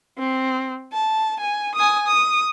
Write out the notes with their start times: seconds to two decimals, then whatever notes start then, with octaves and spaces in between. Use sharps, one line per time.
0.19 C4
0.92 A5
1.40 G#5
1.75 G#5 D#6
2.07 D#6